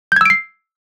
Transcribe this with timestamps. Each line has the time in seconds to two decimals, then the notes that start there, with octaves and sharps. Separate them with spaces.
0.12 G6
0.16 G#6
0.21 E6
0.26 D7
0.30 C7